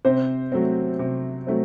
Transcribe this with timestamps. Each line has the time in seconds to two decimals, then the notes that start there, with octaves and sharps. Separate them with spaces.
0.05 C3 C5
0.52 F#3 A3 C4
0.99 C3
1.47 F#3 A3 C4